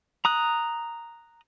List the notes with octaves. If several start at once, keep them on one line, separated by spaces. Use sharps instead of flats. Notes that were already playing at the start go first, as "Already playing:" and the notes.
A#5 D#6 F#6